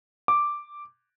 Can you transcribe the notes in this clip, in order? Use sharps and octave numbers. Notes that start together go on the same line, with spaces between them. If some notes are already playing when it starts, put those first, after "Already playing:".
D6